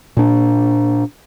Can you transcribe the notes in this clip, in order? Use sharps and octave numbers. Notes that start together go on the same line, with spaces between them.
A#2 D4